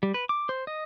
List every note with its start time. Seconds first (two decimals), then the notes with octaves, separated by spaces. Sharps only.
0.03 G3
0.14 B4
0.29 D6
0.49 C5
0.67 D#5